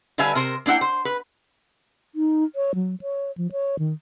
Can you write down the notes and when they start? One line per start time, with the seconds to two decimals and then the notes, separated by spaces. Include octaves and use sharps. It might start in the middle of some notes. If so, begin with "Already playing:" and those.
0.18 D3 G3 B4 E5 F5 G#5
0.35 C3 A#4 C5
0.66 A#3 D4 E4 F#5 G5
0.81 C5
1.05 B4
2.15 D#4
2.56 C#5
2.75 F#3
3.01 C#5
3.38 F3
3.52 C#5
3.79 D#3